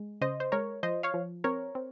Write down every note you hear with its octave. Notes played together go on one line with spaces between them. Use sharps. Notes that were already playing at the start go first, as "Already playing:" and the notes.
Already playing: G#3
C#3 C5 D#5
C5
G#3 A#4 C#5
F3 C5 D#5
C#5 F5
F3
C4 A#4 C#5
C4